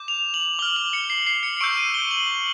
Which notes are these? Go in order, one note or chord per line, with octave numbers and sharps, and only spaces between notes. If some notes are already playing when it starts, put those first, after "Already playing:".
Already playing: D6 G6
F7
F#7
D6 F6 G7
F#7
C#7
C7
C7
C#7
C#7
C#6 E6 G6 D7
D#7
G7
F#7